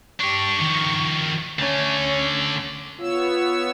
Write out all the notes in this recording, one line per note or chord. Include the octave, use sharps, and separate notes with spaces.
D4 G4 C#6
D#3 F3
D3 A3 C#4 C#5
B3 F4 C#5 E6